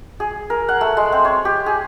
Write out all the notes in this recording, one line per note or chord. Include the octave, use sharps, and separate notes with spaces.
G#4
A#4
F#5
A3
G#3
C4
C#5
G4
G#4